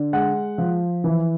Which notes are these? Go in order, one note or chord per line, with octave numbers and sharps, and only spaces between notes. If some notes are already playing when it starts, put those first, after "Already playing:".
Already playing: D3
G#3 F#5
F3
E3